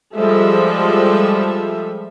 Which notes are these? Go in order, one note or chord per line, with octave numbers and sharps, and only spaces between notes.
F3 G3 G#3 A4 E5